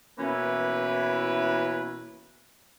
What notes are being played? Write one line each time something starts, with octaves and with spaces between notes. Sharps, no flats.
B2 E3 A#3 C#4 E4 B4